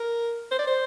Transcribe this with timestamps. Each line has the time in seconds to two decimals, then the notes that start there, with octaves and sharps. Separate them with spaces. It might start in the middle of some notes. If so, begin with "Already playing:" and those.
Already playing: A#4
0.51 C5
0.59 D5
0.67 C5